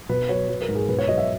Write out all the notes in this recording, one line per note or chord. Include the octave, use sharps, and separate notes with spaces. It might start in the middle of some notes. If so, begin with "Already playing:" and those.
B2 B4
F#3 C#5
F#3 B4
A#4
G#2
G#4
B2 B4
C#5
F#3 D#5
E5